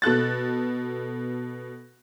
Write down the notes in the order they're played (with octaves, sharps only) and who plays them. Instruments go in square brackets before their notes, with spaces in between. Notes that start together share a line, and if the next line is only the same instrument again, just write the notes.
[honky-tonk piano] B2 A4 F#6 A6